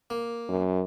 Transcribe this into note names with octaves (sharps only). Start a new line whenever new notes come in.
A#3
F#2